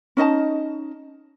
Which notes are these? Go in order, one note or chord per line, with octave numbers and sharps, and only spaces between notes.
C#4 D#4 D#5 A5